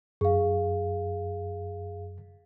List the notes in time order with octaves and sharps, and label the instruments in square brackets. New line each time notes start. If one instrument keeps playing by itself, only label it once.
[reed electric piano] F#2 [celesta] G#4 F5